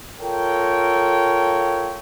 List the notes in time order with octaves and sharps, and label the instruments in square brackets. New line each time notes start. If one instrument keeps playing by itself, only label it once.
[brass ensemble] F4 A4 A#4 C#5 G5